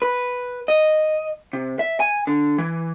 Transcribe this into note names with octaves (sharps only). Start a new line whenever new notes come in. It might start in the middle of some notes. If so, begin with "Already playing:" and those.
B4
D#5
C3
E5
G#5
D3
E3